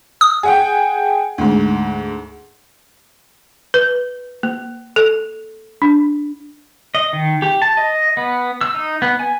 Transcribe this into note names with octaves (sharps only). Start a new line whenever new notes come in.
D#6
G#4 F#5 G5
D2 G#2
B4
A#3
A4
D4
D#5
D#3
G4
A5
D#5
B3
E6
D#4
B3
G#5